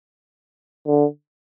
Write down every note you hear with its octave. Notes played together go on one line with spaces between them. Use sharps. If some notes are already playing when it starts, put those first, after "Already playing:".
D3